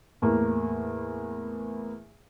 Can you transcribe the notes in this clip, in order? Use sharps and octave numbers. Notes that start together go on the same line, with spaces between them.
E2 A2 A#3